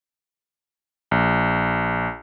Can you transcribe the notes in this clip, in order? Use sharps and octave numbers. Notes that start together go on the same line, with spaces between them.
A#1